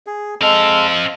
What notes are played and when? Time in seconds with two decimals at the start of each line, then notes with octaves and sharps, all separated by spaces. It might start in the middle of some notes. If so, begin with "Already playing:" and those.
0.06 G#4
0.41 G#3 C4 A4 F5